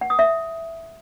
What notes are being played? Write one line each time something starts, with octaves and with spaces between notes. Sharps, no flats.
F#5
D#6
E5